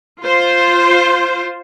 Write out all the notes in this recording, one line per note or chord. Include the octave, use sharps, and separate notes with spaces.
F4 C5